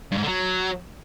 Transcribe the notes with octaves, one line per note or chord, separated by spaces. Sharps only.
G2
G#2
D3
F#3